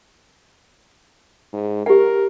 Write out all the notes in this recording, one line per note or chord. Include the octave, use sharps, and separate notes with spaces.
G#2
G4 A#4 F#5